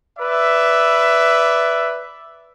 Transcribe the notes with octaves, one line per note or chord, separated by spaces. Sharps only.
B4 D5 E5